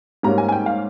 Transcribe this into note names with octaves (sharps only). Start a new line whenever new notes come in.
G#2 G3 A#3 C#4 A#5
G#5
G#5
G5
F5